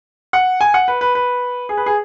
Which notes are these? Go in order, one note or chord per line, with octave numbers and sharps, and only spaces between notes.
F#5
G#5
F#5
B4
B4
B4
G#4
B4
G#4